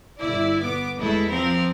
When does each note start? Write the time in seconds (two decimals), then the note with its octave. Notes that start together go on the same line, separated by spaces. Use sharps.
0.19 G1 E4 D5
0.62 B3 D6
0.99 E2 G#3 A3 E4
1.30 F3 C4 A#4